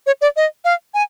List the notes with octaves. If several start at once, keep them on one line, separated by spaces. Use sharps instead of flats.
C#5
D5
D#5
F5
G#5